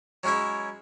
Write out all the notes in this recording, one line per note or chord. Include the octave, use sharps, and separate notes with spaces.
F#3 G#3 C#4 E4 E5